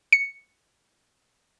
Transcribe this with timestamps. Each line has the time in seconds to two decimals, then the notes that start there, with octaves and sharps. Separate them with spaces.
0.12 C#7